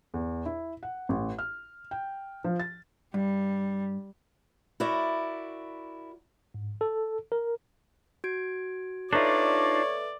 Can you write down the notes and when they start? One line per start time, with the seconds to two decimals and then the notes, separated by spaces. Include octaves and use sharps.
0.14 E2
0.46 E4
0.83 F#5
1.09 A1
1.39 F6
1.91 G5
2.44 F3
2.60 A6
3.14 G2 G3
4.80 E4 F#4 A#4 D5
6.54 G#2
6.81 A4
7.32 A#4
8.24 F#4 G#6 D7
9.13 D4 D#4 F4 A4 B4 C#5 D5 E5